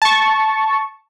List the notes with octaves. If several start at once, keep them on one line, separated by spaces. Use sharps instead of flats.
A5 C#6